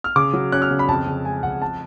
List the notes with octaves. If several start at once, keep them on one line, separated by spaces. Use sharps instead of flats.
F6
C#3 D6
F#3
C#4 F#6
F6
C#3
B5
F2 A5
C#3
G#3 G#5
F2 F#5
A5